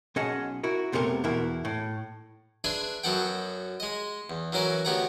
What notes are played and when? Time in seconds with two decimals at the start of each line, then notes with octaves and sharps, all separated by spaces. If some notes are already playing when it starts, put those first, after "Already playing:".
0.16 B1 C#4 G#4 D#5 F#5 A5
0.63 E4 F#4 A#4
0.92 F2 C3 A3 B3 G4 A#4
1.24 E2 B2 E4 A#4
1.65 A2
2.64 D4 G#4 B4 E5 G#5 C6
3.04 F#2 F#3 B3 A4 F#5 G5
3.80 G#3 D#5
4.30 E2
4.53 E3 F#3 C#4 A#4 B4
4.85 D2 B3 G4 C#5 F#5 A#5